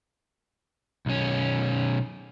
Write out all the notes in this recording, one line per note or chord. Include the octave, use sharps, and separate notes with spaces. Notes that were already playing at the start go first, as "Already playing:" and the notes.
B1 C#4